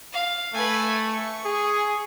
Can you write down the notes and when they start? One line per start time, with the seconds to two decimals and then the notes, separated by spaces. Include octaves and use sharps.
0.13 F5
0.54 A3 B4 G#5
1.07 C#6
1.45 G#4